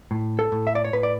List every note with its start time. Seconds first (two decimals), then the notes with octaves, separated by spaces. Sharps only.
0.11 A2
0.39 A4
0.52 A2
0.67 E5
0.75 D5
0.85 C#5
0.93 A2 B4
1.03 D5